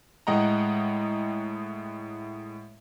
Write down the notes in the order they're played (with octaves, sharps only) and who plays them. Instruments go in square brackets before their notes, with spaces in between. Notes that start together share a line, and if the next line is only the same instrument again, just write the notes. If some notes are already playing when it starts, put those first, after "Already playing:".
[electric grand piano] A2 G#3 D#5 F#5 G5 A#5